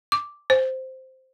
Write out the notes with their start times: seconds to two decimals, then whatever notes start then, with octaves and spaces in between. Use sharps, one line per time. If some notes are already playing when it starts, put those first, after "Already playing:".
0.12 D6
0.50 C5